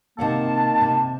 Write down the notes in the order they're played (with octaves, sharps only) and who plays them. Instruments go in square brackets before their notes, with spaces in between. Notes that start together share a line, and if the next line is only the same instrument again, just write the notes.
[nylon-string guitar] C3 F5 F#5 [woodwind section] D#3 A#3 A5
[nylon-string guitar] C3